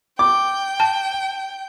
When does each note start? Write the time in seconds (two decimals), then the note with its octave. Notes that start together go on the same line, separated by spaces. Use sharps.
0.19 G5 D6
0.80 A5